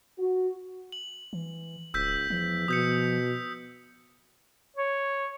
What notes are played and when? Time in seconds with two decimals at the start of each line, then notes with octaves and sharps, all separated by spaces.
0.18 F#4
0.92 F#7
1.33 E3
1.94 D1 C#2 E6 G6 B6
2.30 E2 F3
2.68 B2 D#6 G6 C#7
4.76 C#5